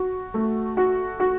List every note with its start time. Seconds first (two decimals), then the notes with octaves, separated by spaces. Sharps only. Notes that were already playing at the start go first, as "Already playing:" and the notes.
Already playing: F#4
0.34 A3
0.77 F#4
1.20 F#4